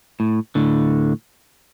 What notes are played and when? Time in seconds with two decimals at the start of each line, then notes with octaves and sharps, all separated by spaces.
0.20 A2
0.55 A2 D3